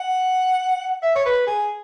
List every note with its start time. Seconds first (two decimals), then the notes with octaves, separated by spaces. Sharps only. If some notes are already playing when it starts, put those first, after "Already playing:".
Already playing: F#5
1.03 E5
1.15 C#5
1.26 B4
1.47 G#4